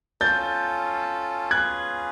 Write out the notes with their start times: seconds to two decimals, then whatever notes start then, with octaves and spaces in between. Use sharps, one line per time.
0.21 C#4 F4 A4 G6 A6
1.51 C#4 F4 G#4 B4 F#6 G#6